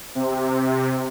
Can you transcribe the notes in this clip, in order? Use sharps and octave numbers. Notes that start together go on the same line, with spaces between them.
C3